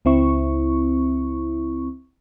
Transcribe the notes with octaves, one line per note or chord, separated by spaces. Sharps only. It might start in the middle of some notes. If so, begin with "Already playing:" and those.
C#2 C4 E4 C#6